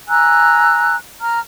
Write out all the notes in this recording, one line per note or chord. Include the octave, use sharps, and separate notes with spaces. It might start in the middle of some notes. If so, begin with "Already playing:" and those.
G#5 A#5 E6 F#6
A#5 F6